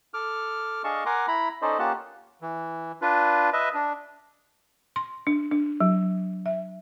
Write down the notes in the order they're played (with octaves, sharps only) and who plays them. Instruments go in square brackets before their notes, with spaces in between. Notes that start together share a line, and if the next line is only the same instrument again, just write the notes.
[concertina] A4 D6 F6
D4 G#4 D#5 F5 A5 C#6
A#4 F#5 G#5 A#5 C6 D6
E4 A#5 B5
C#4 D#4 A4 C5 D5 D#5
A#3 C#4 F4 G4 F#5 A5
[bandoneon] E3
D4 F4 B4
B4 D#5 E5
D4
[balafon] C6
D4
D4
F#3
E5